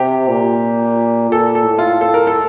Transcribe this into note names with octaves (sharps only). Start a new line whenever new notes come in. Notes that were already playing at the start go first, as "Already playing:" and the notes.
Already playing: C3 G4
A#2
A#2 A4
A4
A2
F4
A2 A4
A#4
A4